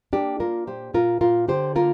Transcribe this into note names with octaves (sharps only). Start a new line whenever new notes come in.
A#3 D4 G4
A#3 F4 A#4
A#2 G4 C5
A#2 F4 A#4
A#2 F4 A#4
D3 G4 C5
A#3 F4 A#4